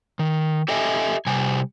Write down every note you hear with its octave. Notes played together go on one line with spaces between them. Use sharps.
D#3
G4 A4 D#5 E5 G#5
C3 G3 G#5